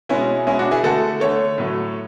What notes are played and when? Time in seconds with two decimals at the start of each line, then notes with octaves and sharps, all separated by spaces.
0.09 B2 G#3 C#4 E4
0.47 B2 G#3 C#4 E4
0.59 D4 F#4
0.71 E4 G#4
0.83 D3 A3 F#4 A4
1.20 D3 A3 A4 C#5
1.58 A2 F#3 A3